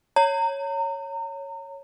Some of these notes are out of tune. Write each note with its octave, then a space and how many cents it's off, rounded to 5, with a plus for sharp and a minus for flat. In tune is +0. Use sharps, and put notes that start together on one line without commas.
C#5 +0 A#5 -30